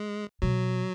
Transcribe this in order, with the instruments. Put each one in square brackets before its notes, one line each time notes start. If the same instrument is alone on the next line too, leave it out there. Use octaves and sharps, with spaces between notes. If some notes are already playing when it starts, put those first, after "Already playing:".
Already playing: [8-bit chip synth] G#3
[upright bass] B2 [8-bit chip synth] F#3